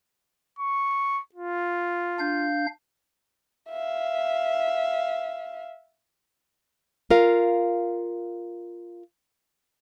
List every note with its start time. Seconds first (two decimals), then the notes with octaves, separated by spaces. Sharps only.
0.59 C#6
1.35 F4
2.19 D4 F5 G6
3.70 E5 F5
7.10 F4 A#4 F5